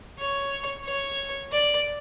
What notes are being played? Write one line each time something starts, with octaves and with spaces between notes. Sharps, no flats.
C#5
C#5
D5